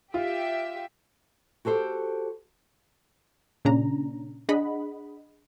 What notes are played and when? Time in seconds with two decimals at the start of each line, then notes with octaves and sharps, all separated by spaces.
0.14 F4 G4 E5
1.65 F#4 G4 A4 C5
3.65 A#2 C#3 C#4 D4 A#5
4.49 D4 G#4 D#5 F#5 B5